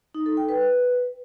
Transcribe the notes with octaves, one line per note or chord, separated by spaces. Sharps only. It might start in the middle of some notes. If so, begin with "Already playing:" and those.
D#4
A4
G5
B4